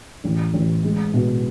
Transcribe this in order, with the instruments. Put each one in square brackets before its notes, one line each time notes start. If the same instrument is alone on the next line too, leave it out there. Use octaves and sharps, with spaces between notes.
[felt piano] A1
A1
G#3
B2